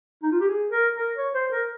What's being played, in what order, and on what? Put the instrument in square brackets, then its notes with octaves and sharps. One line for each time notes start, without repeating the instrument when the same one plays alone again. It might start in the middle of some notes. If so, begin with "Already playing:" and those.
[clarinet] D#4
F4
G4
G#4
A#4
A#4
C#5
C5
A#4